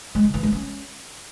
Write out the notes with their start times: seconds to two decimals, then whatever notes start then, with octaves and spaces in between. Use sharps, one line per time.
0.15 G#3
0.24 D3
0.34 E3
0.43 G#3
0.53 C#4